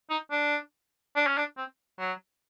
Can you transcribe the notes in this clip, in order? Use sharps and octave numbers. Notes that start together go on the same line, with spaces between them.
D#4
D4
D4
C#4
D4
C4
F#3